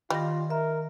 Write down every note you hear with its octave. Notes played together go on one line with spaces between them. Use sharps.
D#3 G3 F4 A#6
A#4 E5